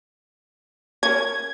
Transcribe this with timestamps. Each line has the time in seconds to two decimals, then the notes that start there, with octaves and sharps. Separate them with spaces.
1.03 C#4 A#4 G#6